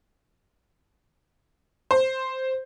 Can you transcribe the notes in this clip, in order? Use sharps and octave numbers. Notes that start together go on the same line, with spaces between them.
C5